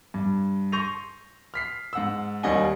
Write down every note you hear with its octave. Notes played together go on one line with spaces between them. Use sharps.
G2
C6 C#6 G6 A#6 D#7 F7
F6 B6 C7
G#2 F#5 E6
D#2 G3 A#3 D#5 F#5 G#5